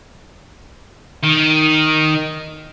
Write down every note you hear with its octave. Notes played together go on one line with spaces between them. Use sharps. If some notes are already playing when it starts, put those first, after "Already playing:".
D#3